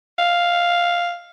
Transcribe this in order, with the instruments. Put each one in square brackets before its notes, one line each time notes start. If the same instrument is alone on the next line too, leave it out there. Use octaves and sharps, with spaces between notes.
[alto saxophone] F5